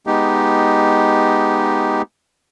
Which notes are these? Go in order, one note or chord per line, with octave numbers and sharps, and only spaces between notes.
G#3 B3 D#4 G4